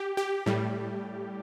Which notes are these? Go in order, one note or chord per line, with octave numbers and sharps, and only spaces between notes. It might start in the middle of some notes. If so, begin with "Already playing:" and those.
Already playing: G4
G4
A2 G3